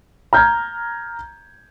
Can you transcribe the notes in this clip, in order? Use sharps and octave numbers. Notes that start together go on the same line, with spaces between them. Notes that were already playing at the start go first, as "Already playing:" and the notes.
A#5 F6 G6 G#6